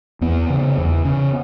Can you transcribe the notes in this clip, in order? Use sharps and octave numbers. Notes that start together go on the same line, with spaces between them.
E2 B3
C#3
E2
C#3